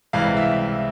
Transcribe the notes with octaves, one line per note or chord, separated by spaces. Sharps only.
C#2 C3 E3 G3 F5
E5